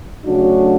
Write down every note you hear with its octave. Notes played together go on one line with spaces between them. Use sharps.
C#3 F#3 A3 D4 F#4